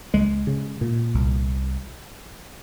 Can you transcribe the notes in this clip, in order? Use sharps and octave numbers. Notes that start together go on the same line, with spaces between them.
C#2 G#3
C#3
A#2
C2